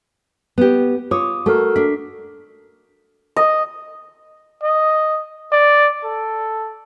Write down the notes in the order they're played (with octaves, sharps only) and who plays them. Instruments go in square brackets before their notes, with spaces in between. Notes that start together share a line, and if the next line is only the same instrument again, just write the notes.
[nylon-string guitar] B3 G4
[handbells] F4 D6 D#6 [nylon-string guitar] C#5
[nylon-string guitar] A3 [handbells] F#4 A4 A#4
[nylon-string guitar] D4 [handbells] B6
[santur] D#5
[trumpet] D#5
D5
A4